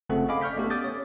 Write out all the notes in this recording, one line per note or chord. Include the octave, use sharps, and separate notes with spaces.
G1 C#3 A3 C4 A4 F#5
D#5 F5 G#5 B5 D6
D5 C#6 F6 G6 B6
A3 B3 C#4 G4 A4
D6 D#6 G6 A6
C#5